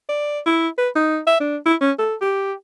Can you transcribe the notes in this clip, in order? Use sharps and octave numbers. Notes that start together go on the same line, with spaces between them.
D5
E4
B4
D#4
E5
D4
E4
C#4
A4
G4